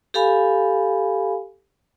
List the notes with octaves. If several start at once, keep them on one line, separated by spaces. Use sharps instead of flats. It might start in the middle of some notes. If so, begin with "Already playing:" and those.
G4 A4 F5 G#5 B5